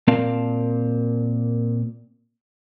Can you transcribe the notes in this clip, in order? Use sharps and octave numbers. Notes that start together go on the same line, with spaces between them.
A#2 C4 A#4 D5 F5 A5